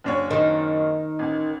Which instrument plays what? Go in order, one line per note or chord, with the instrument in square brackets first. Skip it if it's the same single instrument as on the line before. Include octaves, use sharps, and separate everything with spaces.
[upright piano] F#1 D4 C#5
[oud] D#3
[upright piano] A1